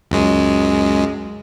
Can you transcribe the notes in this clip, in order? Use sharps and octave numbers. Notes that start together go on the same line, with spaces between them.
C#2 F#2 G#3